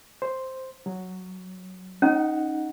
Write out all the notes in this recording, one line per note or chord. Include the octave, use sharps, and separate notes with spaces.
C5
F#3
C#4 D#4 F#5